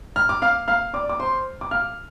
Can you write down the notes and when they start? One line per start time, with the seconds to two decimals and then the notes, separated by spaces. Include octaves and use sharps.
0.16 F6
0.29 D6
0.42 F5 F6
0.68 F5 F6
0.94 D5 D6
1.09 D6
1.20 C5 C6
1.61 D6
1.71 F5 F6